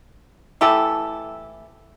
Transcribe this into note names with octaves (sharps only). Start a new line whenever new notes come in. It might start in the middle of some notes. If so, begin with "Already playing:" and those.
E3 A3 G4 A4